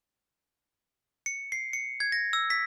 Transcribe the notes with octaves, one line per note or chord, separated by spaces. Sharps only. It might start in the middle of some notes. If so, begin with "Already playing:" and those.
C#7
C7
C#7
G#6
A#6
E6
B6